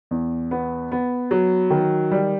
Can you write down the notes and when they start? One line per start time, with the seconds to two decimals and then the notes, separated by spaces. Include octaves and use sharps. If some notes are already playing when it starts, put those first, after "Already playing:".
0.11 E2
0.51 B3
0.92 B3
1.31 F#3
1.70 D#3
2.11 G3